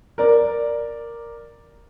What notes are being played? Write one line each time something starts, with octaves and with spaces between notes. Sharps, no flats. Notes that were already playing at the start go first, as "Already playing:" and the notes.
A#4 D5